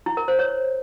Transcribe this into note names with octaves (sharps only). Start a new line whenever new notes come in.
E4
A#4
C5
C#5